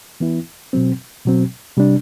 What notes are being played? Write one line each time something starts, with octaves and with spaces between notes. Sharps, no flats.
E3 B3 E4
B2 F#3 C4
B2 F#3 C4
C3 G3 D4